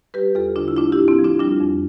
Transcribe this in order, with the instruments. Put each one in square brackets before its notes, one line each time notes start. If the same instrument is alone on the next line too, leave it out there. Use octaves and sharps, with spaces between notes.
[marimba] G3 G4 B4
E2 F4 A4
D3 D4 F4
E4
A3 D4 F4
E4 G4
A2
C4 E4
F3
D4 F4
G3 D4 F4
F2